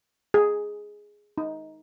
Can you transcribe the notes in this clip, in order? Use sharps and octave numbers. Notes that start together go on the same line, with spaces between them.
G#4
D#4